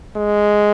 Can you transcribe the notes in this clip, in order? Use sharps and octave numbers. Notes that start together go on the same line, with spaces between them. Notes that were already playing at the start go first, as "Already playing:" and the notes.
G#3